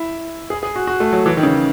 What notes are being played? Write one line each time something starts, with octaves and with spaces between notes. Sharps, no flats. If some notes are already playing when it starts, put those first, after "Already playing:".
Already playing: E4
G#4
G#4
F#4
F#4
A3
F#3
E3
D#3
C#3